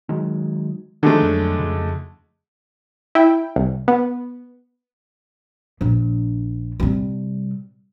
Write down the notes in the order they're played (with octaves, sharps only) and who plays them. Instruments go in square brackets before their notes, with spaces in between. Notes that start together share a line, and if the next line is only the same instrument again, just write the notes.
[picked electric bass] D#3 F#3 G#3
[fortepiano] D3 G#3 A3 [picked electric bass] D#3 F3
[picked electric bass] F2 F#3
F2 C#3
[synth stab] E4 G5
C2
B3
[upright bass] A#1 D4
C3 G3